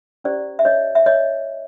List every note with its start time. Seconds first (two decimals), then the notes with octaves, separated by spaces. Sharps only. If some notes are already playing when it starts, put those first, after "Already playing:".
0.24 C#4 E4 G4 C5 D5
0.59 E5
0.65 C#5 D#5
0.95 E5
1.06 C#5 D#5